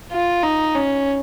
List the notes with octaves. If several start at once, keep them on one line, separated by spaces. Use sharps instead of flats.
F4
D#4
C#4